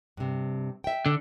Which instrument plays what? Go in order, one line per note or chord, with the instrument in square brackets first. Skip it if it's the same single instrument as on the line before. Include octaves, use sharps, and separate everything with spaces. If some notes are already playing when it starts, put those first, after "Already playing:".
[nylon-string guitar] G2 C3
E5 G5
[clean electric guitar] D3